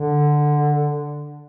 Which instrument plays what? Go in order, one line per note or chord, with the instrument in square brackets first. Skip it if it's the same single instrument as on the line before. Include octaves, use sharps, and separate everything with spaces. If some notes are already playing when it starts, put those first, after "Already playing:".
Already playing: [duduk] D3